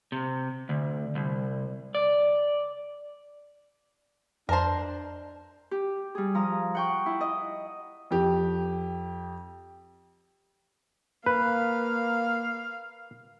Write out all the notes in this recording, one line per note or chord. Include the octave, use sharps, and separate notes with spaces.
C3
D2
C2
D5
F2 D4 A#4 C5 D#5 A5 A#5
G4
G3 G#4
F3 A#5 D#6
F#5 G5 C#6
E4
D#5
F2 G4
A#3 B4 F5